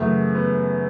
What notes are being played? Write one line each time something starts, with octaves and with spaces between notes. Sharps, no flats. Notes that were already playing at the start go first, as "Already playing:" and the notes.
Already playing: F#2 C#3 E3 A3
B3